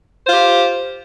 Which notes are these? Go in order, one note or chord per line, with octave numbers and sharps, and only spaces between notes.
F4 G4 C5